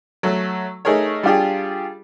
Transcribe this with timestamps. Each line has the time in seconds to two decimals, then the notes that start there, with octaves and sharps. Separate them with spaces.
0.23 F#3 A3
0.85 A3 D#4 G#4 A#4 C#5
1.23 G3 D4 F4 G4 G#4